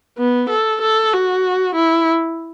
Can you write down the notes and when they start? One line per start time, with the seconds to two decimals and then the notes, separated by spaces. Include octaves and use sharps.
0.18 B3
0.50 A4
0.82 A4
1.12 F#4
1.75 E4